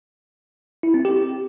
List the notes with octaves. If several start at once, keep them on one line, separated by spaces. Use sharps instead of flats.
E4
C4
G4